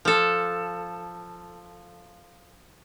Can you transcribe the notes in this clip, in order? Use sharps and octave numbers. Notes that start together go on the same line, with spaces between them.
F3 A4